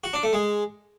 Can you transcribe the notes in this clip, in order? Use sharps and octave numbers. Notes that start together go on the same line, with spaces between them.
F#4
D4
A3
G#3